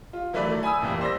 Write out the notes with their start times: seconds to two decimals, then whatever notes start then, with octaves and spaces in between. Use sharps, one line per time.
0.13 F4
0.33 D#3 E3 F#3 A3 B4 D5
0.50 A3
0.63 G#5 B5 D#6 E6
0.81 F2 A#2 E3 G3
1.01 C5 D5 E6 A#6